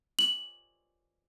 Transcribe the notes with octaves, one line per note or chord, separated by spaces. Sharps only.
F#7